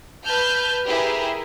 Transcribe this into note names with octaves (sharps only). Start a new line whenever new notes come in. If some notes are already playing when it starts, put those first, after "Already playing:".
B4 A5 F6 G6
E4 G4 G#4 A#4 B4